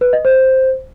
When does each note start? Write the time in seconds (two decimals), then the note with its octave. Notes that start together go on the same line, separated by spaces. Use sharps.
0.01 B4
0.13 D#5
0.25 C5